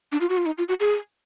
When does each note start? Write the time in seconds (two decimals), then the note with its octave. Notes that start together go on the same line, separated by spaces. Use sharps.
0.12 D4
0.21 F4
0.29 F#4
0.37 F4
0.46 D#4
0.58 F4
0.68 F#4
0.80 G#4